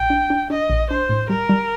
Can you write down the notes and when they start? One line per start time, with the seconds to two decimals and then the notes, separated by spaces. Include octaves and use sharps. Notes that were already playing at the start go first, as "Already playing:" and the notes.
Already playing: A#1 G5
0.10 D4
0.30 D4
0.50 D4 D#5
0.70 A#1
0.90 D4 C5
1.09 A2
1.29 G3 A#4
1.49 G3